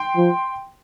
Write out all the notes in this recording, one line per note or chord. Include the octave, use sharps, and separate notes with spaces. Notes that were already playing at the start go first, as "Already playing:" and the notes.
Already playing: G5 C6
F3